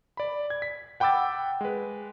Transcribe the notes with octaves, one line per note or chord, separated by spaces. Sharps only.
D5 B5
G#6
B6
F#5 G5 B5 D6 E6 A6
G#3 B4